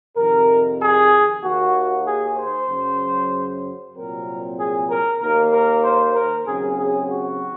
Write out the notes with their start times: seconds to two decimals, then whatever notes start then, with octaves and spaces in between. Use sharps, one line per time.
0.17 F2 C3 D#3 A#4
0.79 G#4
1.43 D#2 D#3 A#3 F#4
2.06 G#4
2.37 C5
2.68 F#2 C#3 F#3
3.94 C2 A#2 F#3 C4 A#4
4.58 G#4
4.89 A#4
5.20 D#2 D#3 A#3 A#4
5.51 A#4
5.84 C5
6.15 A#4
6.46 D#2 C#3 F#3 C4 G#4
6.78 G#4
7.09 F#4